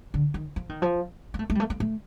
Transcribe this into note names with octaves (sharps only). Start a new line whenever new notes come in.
D3
D#3
F3
D#3
F3
A#3
A3
A3
G3
A3
A#3
A3